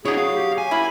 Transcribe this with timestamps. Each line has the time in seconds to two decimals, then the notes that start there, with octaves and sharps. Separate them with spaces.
0.05 F#3 D4 E4 G#4 C#5
0.18 F5
0.34 G4
0.58 G#5
0.71 A#3 E4 B5